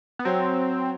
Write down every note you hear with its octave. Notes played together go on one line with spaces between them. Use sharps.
B3
F#3 C4